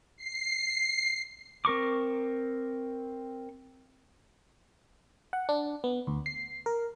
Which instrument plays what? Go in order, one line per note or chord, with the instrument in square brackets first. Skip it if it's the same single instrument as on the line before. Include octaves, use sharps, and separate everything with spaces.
[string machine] C7
[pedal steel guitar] C4 A#4 C#6 D6
[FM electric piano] F#5
D4
B3
D2
C7
A#4